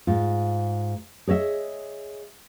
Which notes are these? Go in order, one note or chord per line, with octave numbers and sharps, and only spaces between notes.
G#2 F4
G#4 C#5 D#5 E5